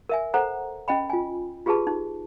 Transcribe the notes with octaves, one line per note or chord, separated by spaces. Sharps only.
A#4 E5 G#5
A4 C5 F#5 A#5
C#4 D#5 G5 B5
F4 G#5
F4 G4 G#4 B4 A5
D#4